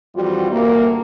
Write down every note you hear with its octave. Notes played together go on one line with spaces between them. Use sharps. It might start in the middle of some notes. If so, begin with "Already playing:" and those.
F2 E3 G3 F4 F#4
D2 G2 A#2 A#3